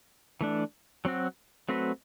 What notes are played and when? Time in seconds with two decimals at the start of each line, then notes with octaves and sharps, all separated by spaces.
0.41 E3 A3 D4
1.05 F#3 C4 F#4
1.69 F#3 A3 C4 F#4 B4